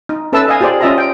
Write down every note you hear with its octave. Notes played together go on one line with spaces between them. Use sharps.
D#4
C#4 A4 B4 E5 A5 E6
D#5 F5 G#5
F4 G4 G#4 C5 D5
C#4 F4 D#5 E5 A5 A#5
G5